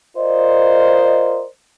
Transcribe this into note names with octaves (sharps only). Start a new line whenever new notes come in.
F4 A#4 C5 D5 D#5